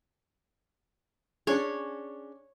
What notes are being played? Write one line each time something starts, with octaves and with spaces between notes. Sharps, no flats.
C#4 D4 G#4 C#5